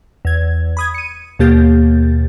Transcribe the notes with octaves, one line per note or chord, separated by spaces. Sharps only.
E2 G#6
B5 D#6 G#6
C#7 D#7
D#2 B2 A#3 G4 G6 A6